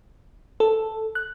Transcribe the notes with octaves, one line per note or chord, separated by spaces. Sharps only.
A4
F#6